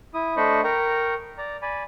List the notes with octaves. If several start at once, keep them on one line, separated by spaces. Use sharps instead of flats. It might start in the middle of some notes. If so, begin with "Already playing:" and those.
E4 D#6
A3 D4 C5 D#5 B5 C#6
A#4 G5 A#5 C#6
D5 A#5
D5 G#5 B5